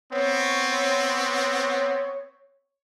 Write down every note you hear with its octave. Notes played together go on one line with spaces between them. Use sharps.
B3 C4 C#5